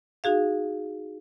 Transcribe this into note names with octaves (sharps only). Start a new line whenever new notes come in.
D#4 F#4 G#4 F5